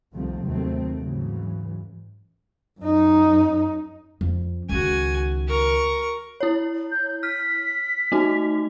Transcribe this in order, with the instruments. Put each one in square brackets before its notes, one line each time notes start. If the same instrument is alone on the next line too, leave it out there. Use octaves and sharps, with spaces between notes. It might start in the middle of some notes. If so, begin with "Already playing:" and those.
[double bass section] C2 C3 D#3 F3 A3 C4
D#2 D#3 F#3 A3 C4
G#2 C#3 E3 F#3
[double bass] F#2 D#4
[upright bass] F2
[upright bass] C#2 D#3 [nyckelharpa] F#4 G#5
[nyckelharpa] A#4 C#6
[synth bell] E4 C#5
[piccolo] G6
[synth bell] F6 [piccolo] B6
[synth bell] A3 D#4 F#4